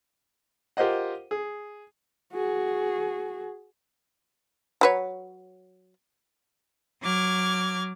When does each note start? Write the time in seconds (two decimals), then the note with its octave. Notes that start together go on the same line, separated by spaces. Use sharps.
0.77 F4 G4 A#4 C5 D#5 F#5
1.31 G#4
2.33 F#4 G#4
4.81 F#3 B4 C#5
7.02 F#3 D6 F6 G#6